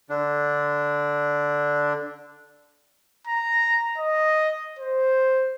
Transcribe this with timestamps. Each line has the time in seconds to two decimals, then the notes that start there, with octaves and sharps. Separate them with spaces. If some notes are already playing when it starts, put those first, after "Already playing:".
0.10 D3 D4
3.27 A#5
3.98 D#5
4.79 C5